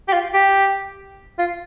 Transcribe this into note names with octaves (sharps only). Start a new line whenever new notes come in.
G4
F4
G4
F4